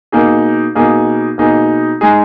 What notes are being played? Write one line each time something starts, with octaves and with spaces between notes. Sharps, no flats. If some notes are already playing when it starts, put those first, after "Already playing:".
B2 A#3 D#4 G#4
B2 A#3 D#4 G#4
B2 A#3 D#4 G#4
G#3 D#4 G#4